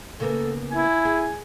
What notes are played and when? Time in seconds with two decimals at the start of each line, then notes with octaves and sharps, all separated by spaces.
0.20 C#3 A#3 B3 A4
0.71 E4 G#5
1.05 G#4